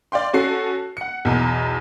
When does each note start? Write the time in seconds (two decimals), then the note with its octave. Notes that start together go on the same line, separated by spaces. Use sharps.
0.12 D5 F5 G5 C6
0.33 C#4 F#4 A4 C7
0.97 F#5 C#7
1.25 B1 E2